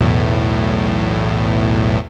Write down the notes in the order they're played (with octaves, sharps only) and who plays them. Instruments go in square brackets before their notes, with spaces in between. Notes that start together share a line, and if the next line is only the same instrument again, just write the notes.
[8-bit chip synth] B1 E2 A2